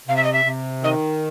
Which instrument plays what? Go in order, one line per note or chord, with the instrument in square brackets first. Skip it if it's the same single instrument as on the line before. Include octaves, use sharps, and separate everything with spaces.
[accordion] C3 [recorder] F5
[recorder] E5
D#5
E5
[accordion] C3
[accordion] D#3 [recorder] D#5